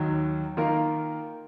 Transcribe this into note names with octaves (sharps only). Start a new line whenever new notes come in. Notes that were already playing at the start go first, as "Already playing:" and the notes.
Already playing: D#2 D#3 F#3
D#3 A#3 F4 A#4